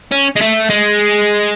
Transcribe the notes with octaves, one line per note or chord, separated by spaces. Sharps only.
C#4
G#3
A3
G#3